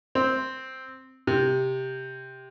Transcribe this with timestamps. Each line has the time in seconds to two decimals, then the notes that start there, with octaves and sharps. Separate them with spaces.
0.15 C4
1.27 C3